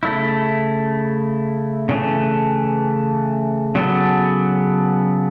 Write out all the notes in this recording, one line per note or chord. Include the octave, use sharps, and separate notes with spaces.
C#3 A3 E4
C#3 E3 A3
C#3 F#3 B3 A4